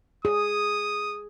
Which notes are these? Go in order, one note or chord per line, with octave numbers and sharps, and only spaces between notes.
G#4 D#6